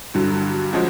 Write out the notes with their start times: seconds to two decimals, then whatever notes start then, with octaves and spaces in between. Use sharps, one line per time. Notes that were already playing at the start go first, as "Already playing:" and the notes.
0.14 G2 D3 F#3
0.73 F3 G#3 C#4 F#4